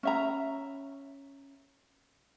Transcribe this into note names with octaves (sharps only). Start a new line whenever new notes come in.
C#4 E5 A#5